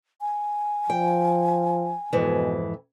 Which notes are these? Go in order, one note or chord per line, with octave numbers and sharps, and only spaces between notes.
G#5
F3 G5
F2 G#2 B2 E3